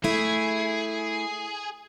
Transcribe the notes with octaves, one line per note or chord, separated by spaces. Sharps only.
A3 E4 G#4